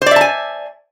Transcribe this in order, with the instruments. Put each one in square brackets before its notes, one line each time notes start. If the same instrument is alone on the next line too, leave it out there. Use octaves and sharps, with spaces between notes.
[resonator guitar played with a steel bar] C5
D5
E5
A5
G#5